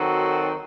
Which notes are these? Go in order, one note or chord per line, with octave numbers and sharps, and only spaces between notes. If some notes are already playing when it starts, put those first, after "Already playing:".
Already playing: D#3 F#3 C4 F#4 A4